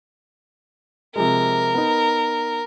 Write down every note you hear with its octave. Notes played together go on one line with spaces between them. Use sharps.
C3 F3 G#3 A#4
B3 D#4